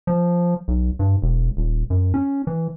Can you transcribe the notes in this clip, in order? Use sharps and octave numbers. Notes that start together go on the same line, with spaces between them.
F3
B1
G2
E1
D#1
F#2
C#4
E3